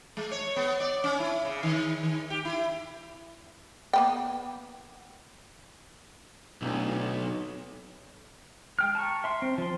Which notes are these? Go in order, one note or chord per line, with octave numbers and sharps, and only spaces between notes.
G#3
C#5
B3
D5
C#4
E4
C#3
D#3
D#3
G4
E4
A#3 B3 G5
D1 B1
G#3 G5 F6
A5 A#5 C#6
E5 C6
C4
F3 C6